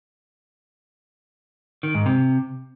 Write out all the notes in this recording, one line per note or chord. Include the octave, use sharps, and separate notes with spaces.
D#3
G#2
C3